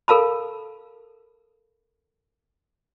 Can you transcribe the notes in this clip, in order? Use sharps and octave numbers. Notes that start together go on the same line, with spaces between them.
A4 A#4 F5 A5 B5